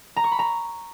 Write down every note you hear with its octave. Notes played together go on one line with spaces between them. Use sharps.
A#5
C#6
B5
A#5